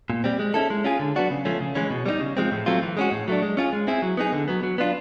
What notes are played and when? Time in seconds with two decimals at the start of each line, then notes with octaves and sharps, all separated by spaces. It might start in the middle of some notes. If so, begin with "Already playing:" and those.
0.10 A#2
0.24 G3 C4
0.39 G#3
0.54 C#4 E4 A4
0.70 G#3
0.84 C#4 F4 G#4
1.00 D3
1.16 F#3 B3 D4 F#4
1.31 C#3
1.45 F3 A3 C#4
1.61 C#3
1.75 E3 G#3 C#4
1.91 B2
2.06 G3 B3 D#4
2.21 C#3
2.37 F3 G#3 C4
2.52 A2
2.66 F#3 A3 C4 F4
2.82 E3
2.97 G#3 C#4 F#4
3.12 A2
3.28 F#3 A3 D4
3.42 G#3
3.57 C#4 F4 G#4
3.73 G#3
3.87 C4 E4 G#4
4.02 F#3
4.17 B3 D#4 G#4
4.32 D3
4.48 F#3 B3
4.63 F#3
4.78 B3 D4 F4